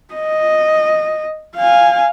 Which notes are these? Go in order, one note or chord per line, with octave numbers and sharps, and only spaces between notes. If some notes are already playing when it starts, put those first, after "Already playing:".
D#5
F5 G#5